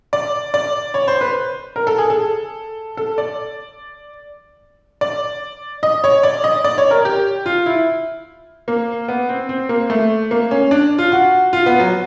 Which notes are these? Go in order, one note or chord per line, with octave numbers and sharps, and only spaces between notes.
D5
D5
C#5
C5
B4
A#4
A4
G#4
A4
A4
D5
D5
D#5
C#5
D5
D#5
D5
C#5
A#4
G4
F4
E4
A#3
B3
C4
C4
A#3
A3
A#3
C#4
D4
F4
F#4
F4
B3
F#3